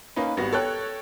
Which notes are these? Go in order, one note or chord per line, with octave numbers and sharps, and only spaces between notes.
A#3 C#4 D#4 B4
G#1 G3 B3 F#4 A#6
A4 C#5 G5 F#6